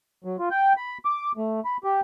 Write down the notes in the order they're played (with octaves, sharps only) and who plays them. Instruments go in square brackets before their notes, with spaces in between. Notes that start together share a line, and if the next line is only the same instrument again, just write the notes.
[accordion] F#3
F4
G5
B5
D6
A3
B5
G4